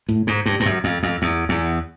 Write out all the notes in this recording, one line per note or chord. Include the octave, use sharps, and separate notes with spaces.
A2
G#2
G2
G2
F#2
F2
F2
E2
E2